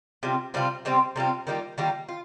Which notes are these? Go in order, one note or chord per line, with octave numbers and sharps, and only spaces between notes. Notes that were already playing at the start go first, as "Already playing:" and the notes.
C3 G3 C4 F4
C3 G3 C4 F4
C3 G3 C4 F4
C3 G3 C4 F4
D#3 G3 A#3 F4
D#3 G3 A#3 F4
F4